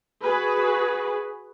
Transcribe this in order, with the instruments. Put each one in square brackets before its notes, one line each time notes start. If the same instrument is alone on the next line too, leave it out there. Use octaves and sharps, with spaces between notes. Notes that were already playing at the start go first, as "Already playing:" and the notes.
[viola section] F#4 G#4 B4